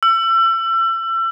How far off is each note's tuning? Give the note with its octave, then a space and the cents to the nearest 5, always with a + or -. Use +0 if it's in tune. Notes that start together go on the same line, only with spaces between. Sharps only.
E6 +30